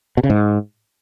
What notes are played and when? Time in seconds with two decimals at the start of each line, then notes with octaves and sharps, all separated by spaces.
0.17 B2
0.24 C#3
0.30 G#2